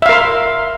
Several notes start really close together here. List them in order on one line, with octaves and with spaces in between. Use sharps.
E5 F5 A#4 C6